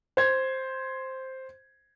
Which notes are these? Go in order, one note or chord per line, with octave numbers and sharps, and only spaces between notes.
C5 G#6